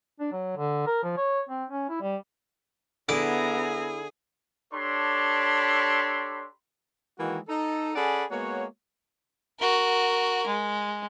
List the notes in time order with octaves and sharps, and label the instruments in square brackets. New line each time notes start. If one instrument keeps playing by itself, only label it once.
[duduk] D4
F#3
D3
A#4
F3
C#5
C4
C#4
E4
G3
[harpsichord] D3 D6 [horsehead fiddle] B3 A#5 [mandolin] E4 [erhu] G#4
[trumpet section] D4 G4 A4 C#5 B5 C6
[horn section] D#3 E3 G#3 A#3 F#4
D#4 A4
C#4 G#4 A4 D5 F#5 B5
G#3 A#3 B3 F#4 C#5
[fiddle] F#4 A#4
G#3